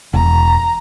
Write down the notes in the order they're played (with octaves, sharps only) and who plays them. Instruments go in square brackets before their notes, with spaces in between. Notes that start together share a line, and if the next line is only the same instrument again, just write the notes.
[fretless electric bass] E1 [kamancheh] A#5